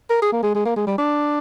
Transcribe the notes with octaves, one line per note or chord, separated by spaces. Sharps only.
A#4
G#4
A#3
G#3
G#3
A#3
G#3
G3
D4